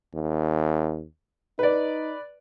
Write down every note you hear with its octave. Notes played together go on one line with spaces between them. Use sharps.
D#2
D#4 B4 D5